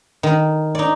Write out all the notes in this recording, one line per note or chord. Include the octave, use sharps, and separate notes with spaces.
D#3
D#4 D5